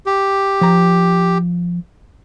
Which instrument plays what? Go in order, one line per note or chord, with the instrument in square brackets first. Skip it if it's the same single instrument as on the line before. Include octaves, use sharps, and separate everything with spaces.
[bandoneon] G4
[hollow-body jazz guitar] F3 A#5